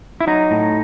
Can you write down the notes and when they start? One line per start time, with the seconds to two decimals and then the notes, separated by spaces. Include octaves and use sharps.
0.21 E4
0.27 F#3 D#4
0.51 A2